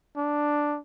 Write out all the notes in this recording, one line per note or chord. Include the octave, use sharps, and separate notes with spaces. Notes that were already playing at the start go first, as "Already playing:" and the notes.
D4